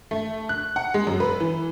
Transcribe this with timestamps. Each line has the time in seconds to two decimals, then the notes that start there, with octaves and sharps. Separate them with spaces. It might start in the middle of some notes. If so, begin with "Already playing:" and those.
0.11 A3
0.49 F#6
0.76 F#5
0.94 G#3
1.07 F#2
1.20 B4
1.40 E3